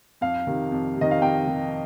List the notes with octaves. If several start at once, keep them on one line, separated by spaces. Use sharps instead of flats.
F2 F5
C3 D#3
F2
C3 D#3 D#5
F5
F2 G5
C3 D#3